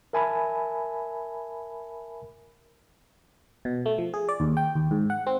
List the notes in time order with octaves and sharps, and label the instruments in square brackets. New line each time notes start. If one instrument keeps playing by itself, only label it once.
[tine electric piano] A#4 E5 G#5 A5 B5
[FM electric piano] B2
A3
F3
G#4
D5
D#2
G5
D#2
G#2
F#5
C4